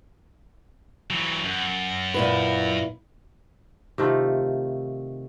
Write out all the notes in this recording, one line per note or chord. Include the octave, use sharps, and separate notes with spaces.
E3 F#3
F#2
A#2 E4 B4
C3 D#3 A3 F4